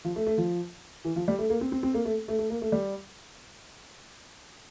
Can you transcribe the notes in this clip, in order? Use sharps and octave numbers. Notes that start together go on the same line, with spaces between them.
F3
A3
A3
F3
E3
F3
G3
A3
A#3
C4
C4
C4
A#3
A3
A3
A3
A#3
A3
G3